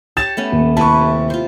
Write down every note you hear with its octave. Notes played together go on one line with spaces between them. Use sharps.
G4 C#5 A5 A6 E7
A3 B3 C#4
D#1
C3 E4 B4 A5 C#6
F4 C5